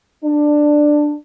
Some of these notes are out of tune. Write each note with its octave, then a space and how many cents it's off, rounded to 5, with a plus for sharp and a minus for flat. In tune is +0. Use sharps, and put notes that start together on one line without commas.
D4 +10